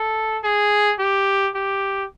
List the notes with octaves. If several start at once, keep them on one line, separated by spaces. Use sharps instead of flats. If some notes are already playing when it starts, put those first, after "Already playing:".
Already playing: A4
G#4
G4
G4